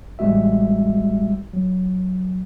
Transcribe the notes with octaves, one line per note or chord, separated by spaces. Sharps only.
A1 G3 G#3 F#4 E5
F#3